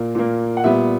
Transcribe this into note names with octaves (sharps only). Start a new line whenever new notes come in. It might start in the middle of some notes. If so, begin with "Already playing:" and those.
Already playing: A#2 A#3
A#2 A#3
F#5
A#2 G3 B3 E5